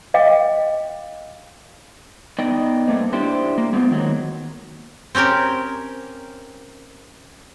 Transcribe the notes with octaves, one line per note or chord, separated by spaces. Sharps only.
D#5 F5 G5 D6
B3 D#4 D5 D#5 G5
G2 A3 A#3 C4
D4 E4 G4 C5
A#3
G#3 B3 C4 F4
D#3 F#3 G#3 A#3
C4 C#4 G4 A#4